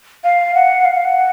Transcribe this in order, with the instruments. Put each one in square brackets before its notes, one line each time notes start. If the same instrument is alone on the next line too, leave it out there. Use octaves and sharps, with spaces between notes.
[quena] F5
F#5
F5
F5
F#5